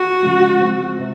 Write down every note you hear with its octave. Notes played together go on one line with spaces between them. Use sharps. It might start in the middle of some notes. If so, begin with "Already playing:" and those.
Already playing: F#4
C#3 F3 G#3
F3 G#3 C4
C3